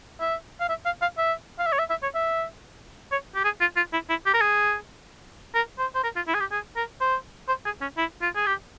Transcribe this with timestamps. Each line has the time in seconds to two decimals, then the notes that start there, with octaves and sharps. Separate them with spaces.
0.20 E5
0.60 F5
0.69 E5
0.85 F5
1.02 F5
1.18 E5
1.59 F5
1.66 E5
1.72 C#5
1.79 E5
1.90 E5
2.03 C#5
2.15 E5
3.12 C#5
3.35 G4
3.44 G#4
3.61 F4
3.76 F4
3.93 E4
4.10 E4
4.26 G4
4.34 A#4
4.41 G#4
5.54 A#4
5.79 C5
5.95 C5
6.04 A#4
6.16 F4
6.28 E4
6.34 G#4
6.40 G4
6.52 G#4
6.76 A#4
7.01 C5
7.48 C5
7.65 G#4
7.81 C#4
7.97 E4
8.21 F4
8.35 G#4
8.46 G4